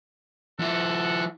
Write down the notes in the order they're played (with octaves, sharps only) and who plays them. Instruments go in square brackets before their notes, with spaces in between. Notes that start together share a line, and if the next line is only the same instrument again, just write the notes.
[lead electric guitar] F3 E4 [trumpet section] A4 F#5